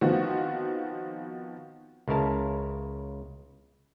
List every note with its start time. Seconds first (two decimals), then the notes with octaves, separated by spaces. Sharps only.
0.01 D#3 F3 B3 C4 F4 F#4
2.08 C#2 C#3 E4 A#4 A5